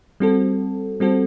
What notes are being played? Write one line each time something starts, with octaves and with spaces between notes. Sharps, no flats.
G3 C4 F#4 A4
G3 C4 F#4 A4